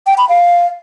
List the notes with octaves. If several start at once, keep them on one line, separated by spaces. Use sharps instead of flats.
G5
B5
F5